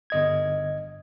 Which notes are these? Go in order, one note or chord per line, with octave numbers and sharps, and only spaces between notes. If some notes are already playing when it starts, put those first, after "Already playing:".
G1 D#5 G#6